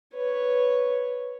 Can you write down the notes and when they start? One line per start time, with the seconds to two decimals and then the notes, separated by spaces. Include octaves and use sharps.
0.15 B4 C#5